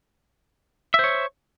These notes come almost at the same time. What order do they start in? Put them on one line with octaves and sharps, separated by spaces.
E5 C5 C#5